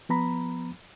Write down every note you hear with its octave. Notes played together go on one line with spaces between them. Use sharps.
F3 B3 A#5 B5